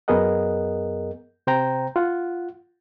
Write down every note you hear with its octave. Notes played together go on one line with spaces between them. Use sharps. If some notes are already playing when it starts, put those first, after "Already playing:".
F#2 B3 G#4 A#4 D#5 F#5
C3 C5 G5 A#5
F4 F#5